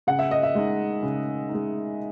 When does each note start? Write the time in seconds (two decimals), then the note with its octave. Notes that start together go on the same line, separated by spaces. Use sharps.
0.07 C#3 F#5
0.19 E5
0.31 D#5
0.43 E5
0.55 G#3 D#4
1.03 C#3
1.49 D#4
1.54 G#3